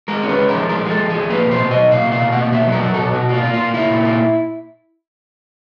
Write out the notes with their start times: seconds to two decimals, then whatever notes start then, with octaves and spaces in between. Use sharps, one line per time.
0.08 G#3 A#4
0.23 C#4
0.29 B4
0.39 G#3
0.48 A#4
0.54 F3
0.69 G#3 A#4
0.85 G#3 A4
1.00 F3
1.10 G#4
1.15 F3
1.30 A#3 B4
1.46 B2
1.51 C5
1.61 B2
1.71 D#5
1.76 F#3
1.91 A#3 F5
2.07 B2 F5
2.22 B2
2.32 A#3 F#5
2.52 B2 E5
2.67 F#3 A#4
2.83 F#3
2.94 B2 A4
3.14 B2 F#4
3.29 A#3 F4
3.44 A#3
3.54 F4
3.60 A#3
3.74 A#3 E4
3.90 A#2
4.05 A#3